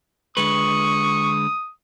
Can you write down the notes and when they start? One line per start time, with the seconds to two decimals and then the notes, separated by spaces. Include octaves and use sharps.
0.37 D3 G#3 B4 C#6 D#6